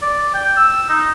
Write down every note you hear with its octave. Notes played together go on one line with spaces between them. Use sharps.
D5
G5
E6
D#4